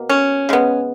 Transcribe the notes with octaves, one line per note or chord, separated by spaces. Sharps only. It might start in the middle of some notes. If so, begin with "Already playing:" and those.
Already playing: B2 A#3
C#4
C#3 G#3 B3